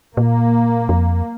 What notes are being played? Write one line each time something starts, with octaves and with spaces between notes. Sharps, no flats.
A#2 A#3
F2